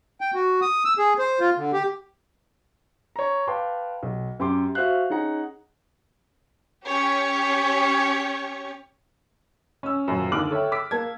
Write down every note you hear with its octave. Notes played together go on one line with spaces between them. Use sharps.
G5
F#4
D#6
E6
G#4
C5
F4
D3
G4
C#5 A#5
B4 F5 G5 A5 C6 D6
B1
F#2 G4 C6 D6
F#4 C5 E5 F5 F#6
C#4 D#4 G#4 F#5 A#5
C#4 G4 C#5
C#4 E6
D#1 F#2
D#2 D3 D6 F6 F#6 F#7
A4 C#5 E5 G5
D6 E6 B6
A#3 A5 G#6